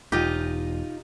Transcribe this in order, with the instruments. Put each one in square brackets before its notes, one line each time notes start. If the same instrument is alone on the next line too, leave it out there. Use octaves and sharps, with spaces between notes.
[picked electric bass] E1 [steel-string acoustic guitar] D#4 F4 D#5 [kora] G4